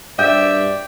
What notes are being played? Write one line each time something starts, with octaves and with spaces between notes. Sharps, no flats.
G2 D5 E5 G5